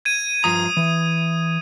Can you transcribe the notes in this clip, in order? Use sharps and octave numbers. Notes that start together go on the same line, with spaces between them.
G#6 D#7
G2 F3 A#5 D#6
E3